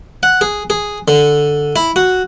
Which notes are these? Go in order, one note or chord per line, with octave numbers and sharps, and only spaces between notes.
F#5
G#4
G#4
D3
E4
F#4